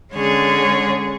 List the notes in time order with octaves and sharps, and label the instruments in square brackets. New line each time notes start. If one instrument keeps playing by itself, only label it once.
[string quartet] D3 G#3 C#4 G#4 C#5